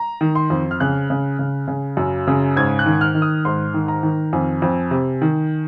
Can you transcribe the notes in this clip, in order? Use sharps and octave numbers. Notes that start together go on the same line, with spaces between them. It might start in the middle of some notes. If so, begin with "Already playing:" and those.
Already playing: A#5
D#3
C6
F2
F6
C#3 F#6
C#3
C#3
C#3
F#2
C#3
G#2 G#6
F#6
D#3
F6
D#3
D#6
G#2 C6
D#3
A#5
D#3
F2 G#5
F2
C3
D#3